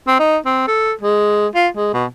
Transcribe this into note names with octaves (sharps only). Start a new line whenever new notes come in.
C4
D#4
C4
A4
G#3
F4
G#3
B2